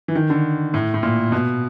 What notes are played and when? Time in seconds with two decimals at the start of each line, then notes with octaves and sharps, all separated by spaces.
0.08 E3
0.15 D#3
0.30 D3
0.74 A2
0.94 A2
1.03 A#2
1.32 B2